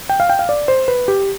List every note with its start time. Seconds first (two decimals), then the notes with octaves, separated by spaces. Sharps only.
0.09 G5
0.20 F5
0.29 G5
0.39 F5
0.49 D5
0.68 C5
0.88 B4
1.08 G4